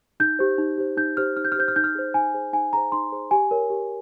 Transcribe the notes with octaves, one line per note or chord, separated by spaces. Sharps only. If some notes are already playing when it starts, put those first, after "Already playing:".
D#4 G6
G4 C5
D#4
G4 C5
D#4 G6
G4 C5 F6
D#4 F6
G6
F6
G4 C5 G6
F6
D#4 G6
F6
G#4 C5
D#4 G#5
G#4 C5
D#4 G#5
G#4 C5 A#5
D#4 C6
G#4 C5
G4 G#5
A#4 C#5
G4